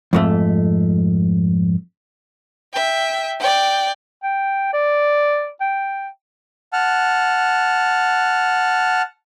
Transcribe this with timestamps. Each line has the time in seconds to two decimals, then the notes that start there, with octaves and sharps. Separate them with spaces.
0.13 F2 G#2 A3
2.73 E5 G5
3.39 D5 G5
4.23 G5
4.73 D5
5.61 G5
6.73 F#5 A5 F6